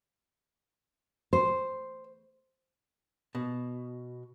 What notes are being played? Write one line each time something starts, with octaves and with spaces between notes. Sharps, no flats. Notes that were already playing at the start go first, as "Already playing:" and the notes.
C5
B2